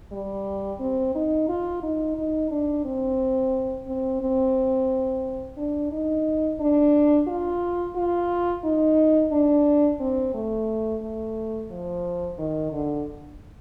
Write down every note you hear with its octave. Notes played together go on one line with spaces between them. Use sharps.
G3
C4
D#4
F4
D#4
D#4
D4
C4
C4
C4
D4
D#4
D4
F4
F4
D#4
D4
C4
A3
A3
F3
D#3
D3